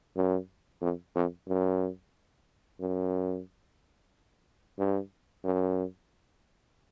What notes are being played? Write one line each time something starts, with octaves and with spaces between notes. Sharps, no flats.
F#2
F2
F2
F#2
F#2
G2
F#2